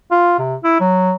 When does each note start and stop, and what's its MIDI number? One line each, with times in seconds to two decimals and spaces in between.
0.11 0.37 65
0.39 0.55 48
0.64 0.80 64
0.80 1.13 54